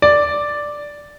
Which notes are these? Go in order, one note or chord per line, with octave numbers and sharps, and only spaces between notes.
D5